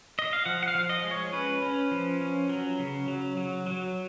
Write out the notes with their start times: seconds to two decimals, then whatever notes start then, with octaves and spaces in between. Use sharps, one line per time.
0.19 D#5
0.33 F5
0.46 F3 F#5
0.63 F#5
0.68 F5
0.75 F3
0.89 D#5
1.04 G#3
1.11 C#5
1.33 C#4 B4
1.62 C#4
1.91 F3
2.21 C#4
2.49 F#3
2.79 C#3
3.08 F#3
3.37 F#3
3.66 F#3